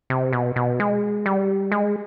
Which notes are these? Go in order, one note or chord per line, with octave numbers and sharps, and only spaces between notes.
C3
B2
B2
G#3
G3
G#3